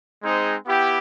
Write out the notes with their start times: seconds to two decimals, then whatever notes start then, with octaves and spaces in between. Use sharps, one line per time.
0.23 G#3 C4 D#4 G#4 C5
0.66 B3 E4 G4